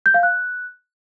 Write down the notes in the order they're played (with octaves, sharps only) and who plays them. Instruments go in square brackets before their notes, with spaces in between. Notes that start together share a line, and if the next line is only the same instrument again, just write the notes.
[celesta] G6
F5
F#6